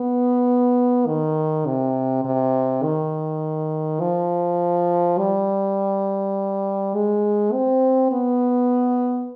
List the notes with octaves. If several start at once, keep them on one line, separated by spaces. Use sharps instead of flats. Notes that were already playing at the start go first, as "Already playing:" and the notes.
Already playing: B3
D#3
C3
C3
D#3
F3
G3
G#3
C4
B3